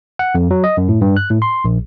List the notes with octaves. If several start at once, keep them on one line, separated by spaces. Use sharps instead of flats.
F#5
F2
F#3
D#5
F#2
A2
G2
F#6
A2
C6
A#1